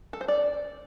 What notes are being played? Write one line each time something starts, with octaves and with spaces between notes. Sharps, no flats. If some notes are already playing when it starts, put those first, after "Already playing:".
A4
C5
D5